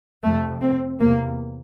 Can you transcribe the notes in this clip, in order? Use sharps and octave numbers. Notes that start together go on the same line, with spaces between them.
F2 C3 A3
C4
E2 C3 A#3